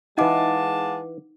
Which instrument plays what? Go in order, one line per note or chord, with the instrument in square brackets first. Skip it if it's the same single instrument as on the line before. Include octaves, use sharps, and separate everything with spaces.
[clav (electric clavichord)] E3 D#5 [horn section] G#3 A5 [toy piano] D#4 [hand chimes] F5 F#5 D6